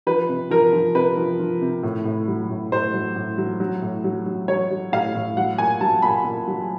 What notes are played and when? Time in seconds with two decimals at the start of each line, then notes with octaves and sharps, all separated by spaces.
0.07 F3 B4
0.29 C3
0.50 F3 A#4
0.73 F3
0.95 C3 B4
1.17 F3
1.39 F3
1.62 C3
1.83 A2
2.05 A2
2.28 F#3
2.49 A2
2.72 A2 C5
2.93 F#3
3.16 A2
3.38 F#3
3.60 F#3
3.82 A2
4.04 F#3
4.26 F#3
4.48 F#3 C#5
4.70 F#3
4.92 A2 F5
5.15 A2
5.37 F#3 F#5
5.58 A#2 G#5
5.81 F#3 A5
6.02 A#2 B5
6.24 A#2
6.47 F#3